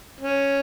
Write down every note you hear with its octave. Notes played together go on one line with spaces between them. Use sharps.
C#4